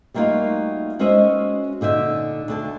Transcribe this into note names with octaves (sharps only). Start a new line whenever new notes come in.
G3 A3 A#3 D#4 F4 F#4
G#3 C#4 F#4 C5 D#5 E5
A#2 D3 D#4 E5
D2 D3 A5